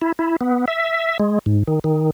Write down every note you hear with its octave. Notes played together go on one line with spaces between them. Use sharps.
E4
E4
B3
E5
G#3
G#2
D#3
D#3